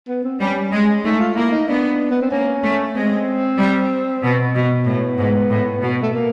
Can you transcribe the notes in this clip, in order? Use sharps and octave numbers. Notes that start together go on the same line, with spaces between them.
B3
C4
G3 C#4
G#3
A3 D#4
F4
A#3 E4
D#4
B3 D4
B3
C4
A#3 C#4
A3
G#3 C4
G3
B2
B2
A2 B3
G#2
A2
B2
A3
A#3